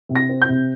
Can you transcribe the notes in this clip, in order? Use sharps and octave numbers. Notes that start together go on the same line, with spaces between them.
C3
A#6
C4
G6
C3